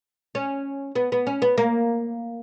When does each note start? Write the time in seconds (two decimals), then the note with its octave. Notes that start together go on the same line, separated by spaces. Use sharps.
0.35 C#4
0.95 B3
1.12 B3
1.27 C#4
1.42 B3
1.58 A#3